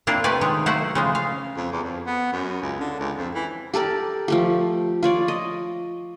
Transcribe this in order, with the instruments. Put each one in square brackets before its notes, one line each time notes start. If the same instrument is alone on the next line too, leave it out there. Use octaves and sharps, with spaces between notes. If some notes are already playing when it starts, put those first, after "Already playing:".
[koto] A#3 C4 D4 E4 F4 A#4
C3 A3 B4 D5 G#5
C3 D#3 G#3 C#5
F#3 A3 A#3 C5 E5 F#5
C#3 F3 G#3
F5
[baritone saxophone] F2
E2
F2
B3
F#2
C#2
D3
C#2
F2
E3
[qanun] G4 A4 A#4 D5
F3 A3 G4
F4 C#5 D5
D#5